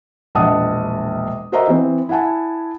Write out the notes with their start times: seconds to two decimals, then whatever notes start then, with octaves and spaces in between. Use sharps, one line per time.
0.35 E1 A#1 D#5 F#5 A5 D#6
1.52 F#4 A#4 C5 D#5 E5 A#5
1.68 E3 C4
2.09 E4 E5 F#5 G#5 A5